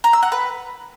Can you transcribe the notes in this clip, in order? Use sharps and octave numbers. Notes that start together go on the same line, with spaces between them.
A#5
E6
F#5
B4